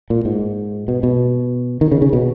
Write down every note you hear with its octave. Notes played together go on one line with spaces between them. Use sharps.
A#2
G#2
B2
B2
D#3
C#3
C#3
B2